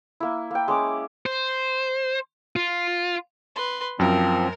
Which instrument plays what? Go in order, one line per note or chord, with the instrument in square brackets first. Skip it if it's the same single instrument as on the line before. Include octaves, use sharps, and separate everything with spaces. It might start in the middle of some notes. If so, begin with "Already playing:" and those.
[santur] A#3 E4
A#3 G5
G#3 C#4 D6
[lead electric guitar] C5
F4
[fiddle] B4 C6
[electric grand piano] F#2 [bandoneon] F3 C4 [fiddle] A#4